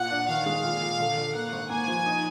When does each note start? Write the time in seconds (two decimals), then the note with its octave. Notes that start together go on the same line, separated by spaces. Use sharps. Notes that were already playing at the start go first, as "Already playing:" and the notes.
Already playing: A#2 F#5
0.11 D4
0.28 D#3 F5
0.46 G#3
0.64 A#2
0.82 A#2
1.00 D3
1.17 D3
1.35 A#3 F#5
1.52 G#1
1.70 A#3 G#5
1.88 F3
2.06 D#4